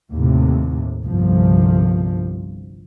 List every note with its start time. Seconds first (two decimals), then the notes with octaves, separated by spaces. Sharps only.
0.14 D#2 A2 C3
1.04 G1 C2 G2 F3